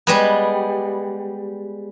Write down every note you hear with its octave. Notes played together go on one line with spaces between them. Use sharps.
G3 G#3 B3